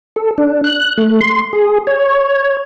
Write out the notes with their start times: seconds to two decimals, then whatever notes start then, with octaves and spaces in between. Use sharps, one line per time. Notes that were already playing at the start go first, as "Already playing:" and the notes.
0.16 A4
0.38 D4
0.64 F#6
0.98 A3
1.21 C6
1.53 G#4
1.87 C#5